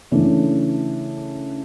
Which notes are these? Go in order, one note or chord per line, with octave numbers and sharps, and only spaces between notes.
C#3 E3 A3 D4